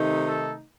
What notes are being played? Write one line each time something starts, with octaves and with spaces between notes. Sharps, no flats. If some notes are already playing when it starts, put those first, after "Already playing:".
Already playing: C3 D#3 A3 D#4
A4